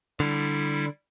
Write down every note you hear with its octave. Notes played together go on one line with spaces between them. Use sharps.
D3 G3 E4